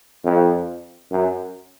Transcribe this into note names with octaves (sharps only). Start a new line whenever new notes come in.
F2
F#2